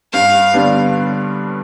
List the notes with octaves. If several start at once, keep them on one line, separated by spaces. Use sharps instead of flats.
G2 F5
D3 G3 B3 D4